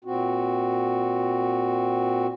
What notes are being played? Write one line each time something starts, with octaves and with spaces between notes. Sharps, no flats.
A#2 C4 F#4